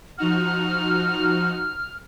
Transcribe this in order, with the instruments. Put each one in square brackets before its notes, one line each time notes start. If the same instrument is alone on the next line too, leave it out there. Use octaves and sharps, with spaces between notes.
[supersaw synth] F3 D#4 F#4 [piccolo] F6